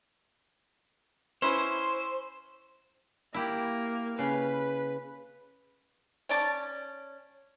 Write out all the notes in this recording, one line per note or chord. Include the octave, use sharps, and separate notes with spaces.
C#4 E4 B4 C5
A#3 E4 G4
C#3 B4
C#4 D5 A5